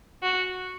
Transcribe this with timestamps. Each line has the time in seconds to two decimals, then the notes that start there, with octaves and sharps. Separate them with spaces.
0.23 F#4